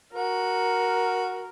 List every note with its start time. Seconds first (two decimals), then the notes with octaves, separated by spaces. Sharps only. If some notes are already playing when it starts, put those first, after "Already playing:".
0.13 F#4 A#4